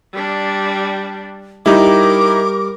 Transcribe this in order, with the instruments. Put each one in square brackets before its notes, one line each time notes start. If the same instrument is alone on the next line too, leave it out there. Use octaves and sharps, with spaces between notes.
[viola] G3 D4
[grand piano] G3 [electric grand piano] D#4 E4 [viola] A#4 [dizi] D6